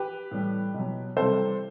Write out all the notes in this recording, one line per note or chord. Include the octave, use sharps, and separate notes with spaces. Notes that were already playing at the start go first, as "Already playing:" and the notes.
Already playing: G4 B4
A2 E3 G3
B2 F#3
C3 E3 G3 A4 C5